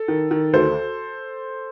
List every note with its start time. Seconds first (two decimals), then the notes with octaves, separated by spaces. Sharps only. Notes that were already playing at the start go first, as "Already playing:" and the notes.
Already playing: A4
0.08 D#3
0.31 D#3
0.53 D2 A4 C5